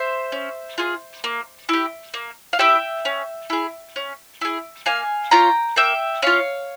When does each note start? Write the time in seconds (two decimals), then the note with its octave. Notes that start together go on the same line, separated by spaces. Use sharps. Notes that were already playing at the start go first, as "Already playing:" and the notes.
Already playing: C5 E5
0.32 C#4
0.78 F4 G#4
1.24 A#3
1.69 E4 G4
2.14 A#3
2.53 F5
2.59 E4 G4 E5 G5
3.05 C#4
3.50 E4 G#4
3.96 C#4
4.41 E4 G#4
4.86 A#3 F5 G#5
5.31 C#4 F4 G5 A#5
5.76 A#3 E5 G5
6.22 C#4 F4 C#5 F5